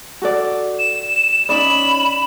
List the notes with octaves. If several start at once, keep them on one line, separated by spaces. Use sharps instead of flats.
F#4 A4 D5
E7
C#4 D#4 D5 B5 E7